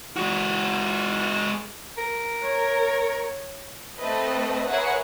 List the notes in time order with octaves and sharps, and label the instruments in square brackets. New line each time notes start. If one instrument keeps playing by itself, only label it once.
[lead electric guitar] G#3 F#4
[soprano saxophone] A#4
[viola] C#5
[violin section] A3 C4 A4 B4 D#5
G#4 A#4 B4 C#5 E5 F#5